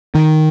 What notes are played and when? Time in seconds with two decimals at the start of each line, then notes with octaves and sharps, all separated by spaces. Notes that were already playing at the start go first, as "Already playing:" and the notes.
0.15 D#3